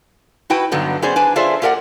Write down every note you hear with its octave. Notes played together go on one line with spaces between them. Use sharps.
E4 F#4 B4 G5
G2 D3 F#3 B3 D#4
B3 C#4 G#4 C5 D5
D4 B4 G#5
F4 G#4 A4 C5 D5 E5
A#3 G4 A#4 D5 F#5